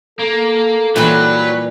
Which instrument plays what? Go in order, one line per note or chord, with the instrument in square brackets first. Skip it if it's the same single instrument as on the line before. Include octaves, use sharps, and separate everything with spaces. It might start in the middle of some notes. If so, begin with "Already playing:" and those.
[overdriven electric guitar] A#3 [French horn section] A4
[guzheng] A#2 E3 G3 [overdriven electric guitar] F#3 [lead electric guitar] B4 B5